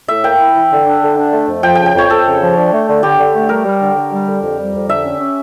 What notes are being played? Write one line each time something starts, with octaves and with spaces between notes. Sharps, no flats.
A2 E5
A#3 G5
E4
E3
D3
D4
D3
D4
A3
F2
F3 G5
C#3 G5
G5
F2 C#5
F2 A4
C#3
F3
D4
A3
D3
D3 G4
D3
A3
G3 A#4
G3
D3
D3
G3
D3
F2
G3
F2
D3 E5
C#4
C#4